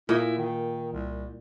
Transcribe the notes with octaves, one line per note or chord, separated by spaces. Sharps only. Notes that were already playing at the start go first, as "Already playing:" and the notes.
A#2 E4 D#5
D#3
C2